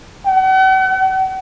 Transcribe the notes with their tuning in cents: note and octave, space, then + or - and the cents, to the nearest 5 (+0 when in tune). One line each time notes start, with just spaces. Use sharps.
F#5 +40